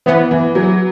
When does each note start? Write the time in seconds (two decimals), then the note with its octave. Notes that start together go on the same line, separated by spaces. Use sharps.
0.06 E3 B3
0.31 E3
0.55 F#3